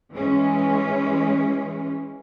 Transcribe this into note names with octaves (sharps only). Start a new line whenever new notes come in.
E3 G#3 C#4